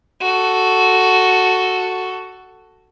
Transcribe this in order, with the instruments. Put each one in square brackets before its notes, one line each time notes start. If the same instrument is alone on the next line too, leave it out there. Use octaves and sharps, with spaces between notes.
[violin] F#4 A4